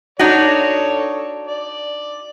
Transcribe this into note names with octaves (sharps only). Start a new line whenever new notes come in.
D4 D#4 F#4 A4 C#5
D5